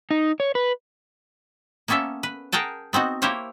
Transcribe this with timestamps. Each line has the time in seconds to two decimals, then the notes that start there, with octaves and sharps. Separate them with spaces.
0.11 D#4
0.40 C#5
0.55 B4
1.88 A#3 B3 C#4 A4 E5
2.23 B4
2.52 G#4 A#4 F#5 G5 A5
2.93 B3 C4 D#4 F#4
3.22 A#3 E4 G4 C5 C#5 F5